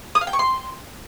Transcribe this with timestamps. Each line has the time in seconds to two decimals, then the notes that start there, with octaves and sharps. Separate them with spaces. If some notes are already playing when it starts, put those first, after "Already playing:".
0.15 D#6
0.21 F5
0.27 G5
0.33 C#6
0.39 C6